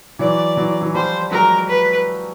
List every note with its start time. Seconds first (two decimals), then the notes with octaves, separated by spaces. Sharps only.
0.19 E3 F#3 D5
0.56 E3 F#3
0.81 E3 F#3
0.94 F3 G3 C5
1.31 F#3 G#3 A#4
1.69 B4